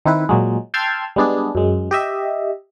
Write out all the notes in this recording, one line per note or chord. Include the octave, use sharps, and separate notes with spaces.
D#3 C4 E4 B4
A#2 F#3 G#3
G5 A5 C6 E6 F6 G#6
G3 G#3 B3 D4 G#4
F#2 G#3
G4 D#5 E5